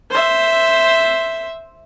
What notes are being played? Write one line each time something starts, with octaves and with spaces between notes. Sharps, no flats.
C5 E5